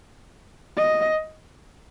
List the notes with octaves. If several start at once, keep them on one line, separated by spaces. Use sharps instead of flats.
D#5